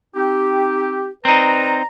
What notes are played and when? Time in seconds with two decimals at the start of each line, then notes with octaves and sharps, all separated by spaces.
0.15 C4 D#4 G4
1.25 C4 D#4 B4 D5 A#5